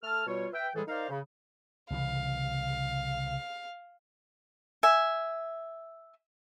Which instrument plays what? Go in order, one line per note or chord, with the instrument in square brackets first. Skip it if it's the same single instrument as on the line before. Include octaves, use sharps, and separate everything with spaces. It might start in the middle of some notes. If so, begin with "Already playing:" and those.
[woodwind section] A3 A4 A5 F6
B2 G3 F4 C#5
B4 E5 G5
A2 E3 G3 G#3 G#4 A4
D#4 A#4 C5 D5 F5
C#3
[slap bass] C2 C#3 E3 [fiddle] F5
[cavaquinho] E5 G#5